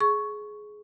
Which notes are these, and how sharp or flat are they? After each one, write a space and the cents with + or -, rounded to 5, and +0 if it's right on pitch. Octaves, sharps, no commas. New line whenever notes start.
G#4 +15 C#6 +0